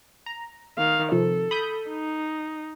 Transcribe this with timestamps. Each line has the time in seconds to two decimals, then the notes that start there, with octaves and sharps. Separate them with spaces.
0.26 A#5
0.77 D#3 F5
1.12 C3 F3 A4
1.51 B5 D#6 G6
1.89 D#4